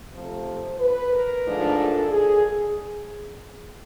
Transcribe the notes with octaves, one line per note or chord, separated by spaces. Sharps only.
C3 F3 A3 C5
B4
A#4
G#2 F3 A3 D4
A4
G#4